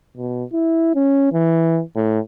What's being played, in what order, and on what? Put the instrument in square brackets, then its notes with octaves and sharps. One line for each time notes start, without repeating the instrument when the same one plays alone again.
[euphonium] B2
E4
C#4
E3
A2